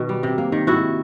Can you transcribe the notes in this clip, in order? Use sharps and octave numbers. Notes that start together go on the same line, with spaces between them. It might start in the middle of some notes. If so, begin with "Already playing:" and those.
Already playing: B2 D#3 B3
G3
C3
A#3
D#3
G#2 E4 F#4